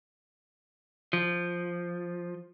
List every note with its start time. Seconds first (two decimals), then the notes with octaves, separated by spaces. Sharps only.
1.13 F3